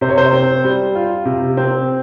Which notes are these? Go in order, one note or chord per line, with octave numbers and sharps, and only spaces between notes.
C3 C5
C#5
C5
C4
G3
F4
C3
C4